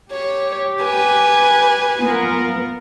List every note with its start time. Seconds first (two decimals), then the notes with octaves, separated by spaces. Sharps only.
0.11 G4 C#5
0.83 B4 G#5
2.00 B3 F4 A#4